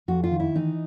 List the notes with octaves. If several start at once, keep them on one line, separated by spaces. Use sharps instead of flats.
F2 F#4
F4
D#3
E4
E3 D#4